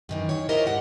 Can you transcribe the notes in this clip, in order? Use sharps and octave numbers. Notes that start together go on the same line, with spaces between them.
F#2 D#3 E3
D#3 C#5
E4 F4 G4 A#4 C5 D#5
D2 G#2 F#5